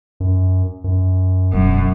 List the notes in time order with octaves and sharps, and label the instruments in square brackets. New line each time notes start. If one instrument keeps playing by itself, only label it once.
[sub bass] F#2
F#2
[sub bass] E1 [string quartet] F#2